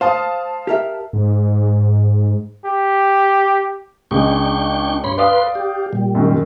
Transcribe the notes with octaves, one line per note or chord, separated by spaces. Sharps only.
C5 F5 A5 D#6
G4 A#4 E5
G#2
G4
C#2 G#3 D4 G5 C#6
G2 C#5 B5 C6
B4 D5 F5 C6 D#6
G4
A#2 G3
F#2 D#3